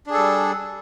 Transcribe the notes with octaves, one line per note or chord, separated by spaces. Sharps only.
G3 D4 G#4 A4